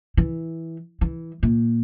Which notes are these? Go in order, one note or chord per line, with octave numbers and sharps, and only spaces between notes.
E3
E3
A#2